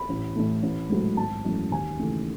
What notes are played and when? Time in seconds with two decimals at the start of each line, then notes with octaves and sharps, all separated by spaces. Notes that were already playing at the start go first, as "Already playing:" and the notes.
Already playing: B5
0.09 A1
0.35 A2 E3 A3
0.63 A1
0.90 G#2 F#3 A3
1.17 G#1 A5
1.45 F#2 E3 A3
1.71 D#2 G#5
1.99 C#3 E3 A3